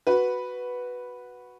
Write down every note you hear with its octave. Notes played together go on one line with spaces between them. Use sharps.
F#4 B4